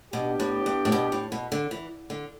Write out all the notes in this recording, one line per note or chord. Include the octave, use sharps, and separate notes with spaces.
B2 B3 D4 G4
A2
G2
A2
B2
A2
B2
D3
E3
D3